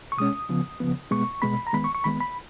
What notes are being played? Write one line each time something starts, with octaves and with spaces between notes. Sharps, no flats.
C#6
B2 G#3 C#4 D#6
C#3 F3 B3
C#3 F3 B3
B2 G#3 B3 C#6
B2 G#3 B3 B5
A#5
D#3 G#3 B3 B5
C#6
C#6
D#3 G#3 B3 B5
B5